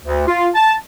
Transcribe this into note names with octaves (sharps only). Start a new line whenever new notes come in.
D2
F4
A5